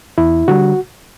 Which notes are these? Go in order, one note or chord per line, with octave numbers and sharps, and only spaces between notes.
E2 E4
D3 G3 F#4